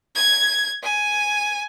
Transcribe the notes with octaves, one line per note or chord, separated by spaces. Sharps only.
G#6
G#5